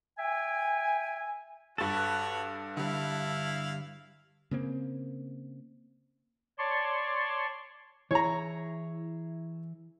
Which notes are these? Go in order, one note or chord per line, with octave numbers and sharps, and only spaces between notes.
E5 G5 G#5
G2 F#4 A4 B4 C#5 A6
D3 G3 E4 F5
C#3 A#3 C4
C#5 D5 A5 C6 C#6
E3 E4 G#4 C#5 A#5